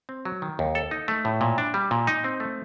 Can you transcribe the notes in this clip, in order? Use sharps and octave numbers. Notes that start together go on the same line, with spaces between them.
C4
F#3
D#3
D#2
A4
D#4
A3
A2
A#2
D4
G3
A#2
D#4
C4
A3